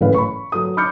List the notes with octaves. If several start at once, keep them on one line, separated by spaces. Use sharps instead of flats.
F#1 A2 C#3 E3 B4 F5
B5 C#6
F#3 A4 D#6
B5 D6 F6 G6 C#7